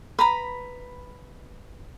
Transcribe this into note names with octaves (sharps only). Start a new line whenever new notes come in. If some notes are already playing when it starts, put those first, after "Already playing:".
B4 A#5 B5